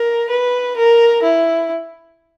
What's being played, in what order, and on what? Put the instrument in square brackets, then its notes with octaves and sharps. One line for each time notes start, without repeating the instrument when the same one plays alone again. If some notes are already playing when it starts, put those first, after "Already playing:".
Already playing: [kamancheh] A#4
B4
A#4
E4